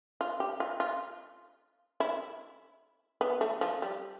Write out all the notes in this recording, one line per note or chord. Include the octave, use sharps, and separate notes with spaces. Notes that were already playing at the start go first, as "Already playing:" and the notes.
F4
G4
F4
F4
E4
B3
A3
F3
G3